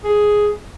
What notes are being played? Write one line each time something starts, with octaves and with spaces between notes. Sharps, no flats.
G#4